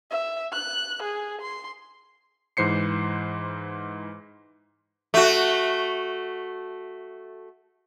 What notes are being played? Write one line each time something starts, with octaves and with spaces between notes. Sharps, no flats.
E5
F#6
G#4
C6
G#2 E3 C5 C7 C#7
A3 F#4